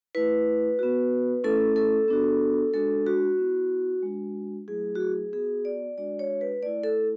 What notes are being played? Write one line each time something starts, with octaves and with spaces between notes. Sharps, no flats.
A3 E4 B4
B3 F#4
A3 C#4 E4 A4
A4
B3 D4 F#4
G#3 D4 F#4 A4
F#4
B3 E4
G#3 D4 F#4
F#3 A3 E4 G#4
F#4
G#4
B3 F#4 G#4
D5
G#3 D4 F#4 D5
C#5
B4
A3 E4 D5
A4